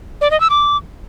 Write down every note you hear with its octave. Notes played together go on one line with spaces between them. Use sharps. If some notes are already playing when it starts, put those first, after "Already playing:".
D5
D#5
E6
D6